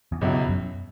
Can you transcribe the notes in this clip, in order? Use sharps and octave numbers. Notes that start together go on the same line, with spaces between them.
E2
C#2 F#2 B2 F#3 E4
F#2